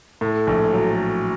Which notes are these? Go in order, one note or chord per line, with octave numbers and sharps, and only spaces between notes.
A2 A4
A#1
F#3